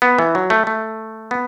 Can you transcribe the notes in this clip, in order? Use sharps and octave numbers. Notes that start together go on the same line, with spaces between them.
B3
E3
F#3
A3
A3
B3